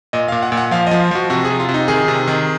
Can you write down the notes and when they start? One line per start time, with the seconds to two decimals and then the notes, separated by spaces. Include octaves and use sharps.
0.13 A#2 D#5
0.28 A#2 F5
0.42 F#5
0.52 A#2
0.57 F#5
0.71 F3 F5
0.87 F3 D#5
1.01 F4
1.11 F3 F#4
1.30 C3 F#4
1.45 G#4
1.50 C3
1.60 F4
1.69 C3
1.74 D#4
1.88 D#3 G#4
2.08 C3
2.28 D#3